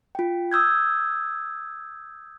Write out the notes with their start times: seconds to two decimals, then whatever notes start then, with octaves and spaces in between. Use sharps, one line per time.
0.15 F4 G5
0.52 D#6 E6 G6 G#6